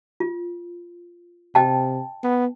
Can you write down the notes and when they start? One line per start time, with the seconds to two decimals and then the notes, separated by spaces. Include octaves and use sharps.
0.20 F4
1.55 C3 D#5 G5 A5
2.24 B3